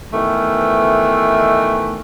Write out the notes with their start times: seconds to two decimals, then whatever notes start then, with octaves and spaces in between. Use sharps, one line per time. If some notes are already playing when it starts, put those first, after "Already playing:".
0.13 B2 D#3 E3 A3